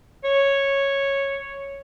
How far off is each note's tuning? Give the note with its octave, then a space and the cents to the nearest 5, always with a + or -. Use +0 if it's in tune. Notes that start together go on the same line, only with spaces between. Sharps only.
C#5 -5